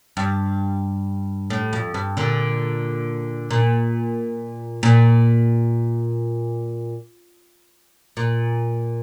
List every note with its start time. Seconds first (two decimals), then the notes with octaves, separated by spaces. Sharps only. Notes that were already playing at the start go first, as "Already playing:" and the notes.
0.17 G2
1.50 A2
1.73 F2
1.94 G2
2.17 A#2 D3
3.51 A#2
4.83 A#2
8.17 A#2